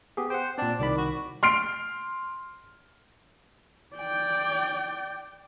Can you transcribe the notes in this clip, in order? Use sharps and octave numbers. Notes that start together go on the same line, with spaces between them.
B3 G4 G#4
C5 F#5 G5
A#2 C4 D4
C2 D#3 D5 B5
F#4
C6 F6 C7 D7
D5 G5